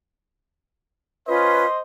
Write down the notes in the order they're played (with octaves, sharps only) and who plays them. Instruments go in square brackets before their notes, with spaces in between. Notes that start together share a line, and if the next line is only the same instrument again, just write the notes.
[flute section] C#4 F4 B4 [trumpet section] C5 D#5 C6